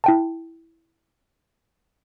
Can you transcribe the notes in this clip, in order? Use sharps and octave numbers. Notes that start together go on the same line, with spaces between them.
E4 G5 A5